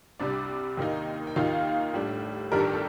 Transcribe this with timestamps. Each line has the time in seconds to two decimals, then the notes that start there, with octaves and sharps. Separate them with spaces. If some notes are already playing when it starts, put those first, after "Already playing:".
0.20 C2 C3 G3 D4 D5
0.77 D#2 D#3 A#3 D#4
1.27 G5
1.36 D#2 D#3 A#3 D#4 F4 F5
1.94 A2 G3 D4
2.52 G1 G2 D#3 G3 D4 A#4
2.60 A4
2.67 G4
2.73 A4